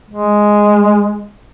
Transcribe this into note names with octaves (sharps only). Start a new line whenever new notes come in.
G#3